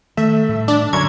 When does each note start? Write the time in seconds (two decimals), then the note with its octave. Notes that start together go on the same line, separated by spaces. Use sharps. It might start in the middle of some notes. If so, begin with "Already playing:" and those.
0.17 D#3 A3 E5
0.49 A2 G3
0.68 D4
0.93 F#2 D3 G3 C#4 C#6 G#6